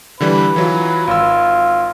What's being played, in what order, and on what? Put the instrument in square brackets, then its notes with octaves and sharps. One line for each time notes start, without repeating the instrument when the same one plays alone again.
[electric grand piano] D3 E3 G3 [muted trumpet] B4
[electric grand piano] E3 F#3 F4
[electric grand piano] G#1 E6 [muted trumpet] F4